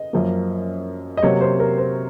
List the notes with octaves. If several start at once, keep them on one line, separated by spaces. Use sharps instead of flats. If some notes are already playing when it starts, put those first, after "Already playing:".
Already playing: D#5
F#2 F3 A#3
D#5
C3 F#3 A#3 C#5
C5
A#4
C5